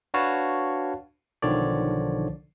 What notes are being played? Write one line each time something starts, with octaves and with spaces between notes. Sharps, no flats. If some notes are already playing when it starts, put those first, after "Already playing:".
D4 F#4 B4 C#5 F5 A5
B1 D3 D#3 F3 C#5 D5